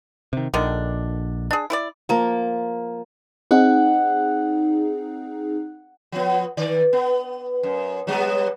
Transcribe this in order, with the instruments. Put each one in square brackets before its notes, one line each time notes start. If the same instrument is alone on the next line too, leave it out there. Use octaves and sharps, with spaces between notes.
[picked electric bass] C3 D#3
[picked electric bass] A#1 [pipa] D3 D#3 D4
[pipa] D4 G#4
E4 B4 D5
[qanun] F3 A#3
[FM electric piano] C4 D#4 G#4 [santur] F#5
[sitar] F3 B3
D#3 D5
B3
F#2
F#3 G3 B3